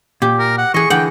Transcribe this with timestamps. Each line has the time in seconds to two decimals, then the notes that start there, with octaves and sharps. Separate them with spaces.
0.22 A#2 G4
0.39 A#4
0.58 F#5
0.74 E3 G#4 D#5 C#6
0.90 D3 E3 F#5 G5